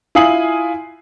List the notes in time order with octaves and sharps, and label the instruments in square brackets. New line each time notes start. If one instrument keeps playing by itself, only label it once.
[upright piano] E4 F4 G#5 D#6 C7 F#7